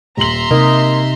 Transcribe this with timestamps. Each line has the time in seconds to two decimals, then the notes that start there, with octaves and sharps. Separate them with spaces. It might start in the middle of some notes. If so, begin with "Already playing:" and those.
0.17 D#1 E5 A#5 C6 F#7
0.51 C3 A#3 D#4